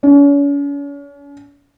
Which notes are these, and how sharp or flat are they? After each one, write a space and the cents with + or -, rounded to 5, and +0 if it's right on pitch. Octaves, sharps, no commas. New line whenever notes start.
C#4 +40